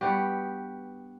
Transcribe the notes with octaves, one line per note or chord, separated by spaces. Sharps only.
G2 B3 F#4 G4